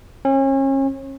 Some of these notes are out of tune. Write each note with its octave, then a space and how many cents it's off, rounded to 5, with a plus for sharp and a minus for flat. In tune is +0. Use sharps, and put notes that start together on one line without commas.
C#4 -35